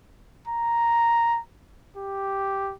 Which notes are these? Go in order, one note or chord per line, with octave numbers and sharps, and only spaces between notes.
A#5
G4